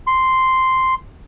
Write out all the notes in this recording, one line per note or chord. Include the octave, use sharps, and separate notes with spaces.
C6